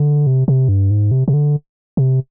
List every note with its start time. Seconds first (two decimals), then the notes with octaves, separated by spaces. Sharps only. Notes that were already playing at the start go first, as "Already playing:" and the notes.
Already playing: D3
0.27 C3
0.48 C3
0.69 G2
0.91 G#2
1.11 C3
1.28 C3
1.34 D3
1.97 C3